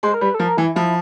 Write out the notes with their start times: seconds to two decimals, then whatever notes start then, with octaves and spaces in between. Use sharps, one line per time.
0.03 G#3 C5
0.14 A#4
0.21 G3 B4
0.34 A4
0.39 F3 A#4
0.57 E3 E4
0.75 F3 E4